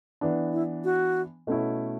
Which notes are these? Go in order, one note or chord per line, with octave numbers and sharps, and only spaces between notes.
E3 B3 D4
E4
F#4
B2 A3 C#4 E4